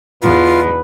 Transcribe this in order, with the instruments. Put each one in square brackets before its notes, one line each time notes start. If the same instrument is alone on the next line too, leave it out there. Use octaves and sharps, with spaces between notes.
[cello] E2 [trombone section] B2 D#4 B4 [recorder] F4